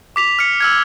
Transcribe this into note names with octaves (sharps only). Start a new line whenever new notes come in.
D6 B6 F7
F6 C#7
E6 F6 G#6